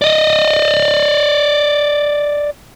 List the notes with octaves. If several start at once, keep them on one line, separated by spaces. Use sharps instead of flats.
D5 D#5